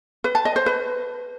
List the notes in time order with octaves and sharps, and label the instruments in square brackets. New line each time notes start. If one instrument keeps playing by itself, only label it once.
[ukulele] B4
A5
D#5
C5
B4